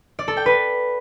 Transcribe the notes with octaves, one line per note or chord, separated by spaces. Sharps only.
D5
A4
G5
B4